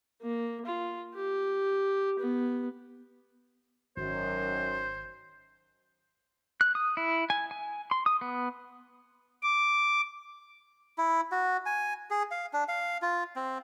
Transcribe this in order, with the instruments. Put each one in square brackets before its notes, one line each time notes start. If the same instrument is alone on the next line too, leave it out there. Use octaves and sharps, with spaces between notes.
[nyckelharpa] A#3
F4
G4
B3
[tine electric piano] G#1 [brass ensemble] F#2 D#3 [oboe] C5
[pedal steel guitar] F#6
D#6
E4
G#5
G#5
C6
D#6
B3
[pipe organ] D6
[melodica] E4
F#4
G#5
G#4
F5
D4
F5
F4
C4